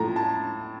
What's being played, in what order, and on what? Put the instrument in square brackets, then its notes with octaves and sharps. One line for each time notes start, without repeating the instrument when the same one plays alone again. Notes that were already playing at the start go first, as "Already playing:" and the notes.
Already playing: [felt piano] A2 F3 A3 A#5
A5